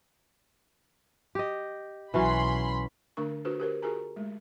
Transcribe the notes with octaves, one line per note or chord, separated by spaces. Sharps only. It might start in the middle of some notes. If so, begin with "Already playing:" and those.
G4 D#5
B1 E3 F#3 C#4 B5 C6
D3 A3 D4 A#4 C#6
D4 F4 F#4 A4 B4 C5
G4 A#4 C5
F4 F#4 G#4 A#4 G#5 A#5
G#3 A3